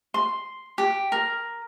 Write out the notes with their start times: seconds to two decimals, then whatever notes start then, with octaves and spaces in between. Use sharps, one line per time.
0.14 C6
0.78 G4
1.12 A#4